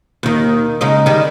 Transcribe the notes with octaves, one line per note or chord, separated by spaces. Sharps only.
D#2 D#3
C#3 G#3 D#4
D#3 G3